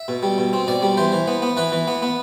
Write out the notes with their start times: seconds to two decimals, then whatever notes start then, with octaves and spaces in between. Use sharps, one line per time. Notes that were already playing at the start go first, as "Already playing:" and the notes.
Already playing: E5
0.08 B2
0.23 G3
0.38 B2
0.53 C4
0.67 B2 D5
0.82 G3
0.97 E3 C5
1.12 E3
1.28 B3
1.42 B3
1.57 E3 B4
1.72 E3
1.88 B3
2.02 B3